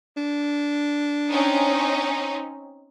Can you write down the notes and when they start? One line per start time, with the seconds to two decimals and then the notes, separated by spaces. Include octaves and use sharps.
0.17 D4
1.30 C4 C#4 D#4